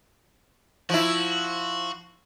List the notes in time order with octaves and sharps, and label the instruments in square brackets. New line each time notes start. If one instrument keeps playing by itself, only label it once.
[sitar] F3 E4 [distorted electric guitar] F#4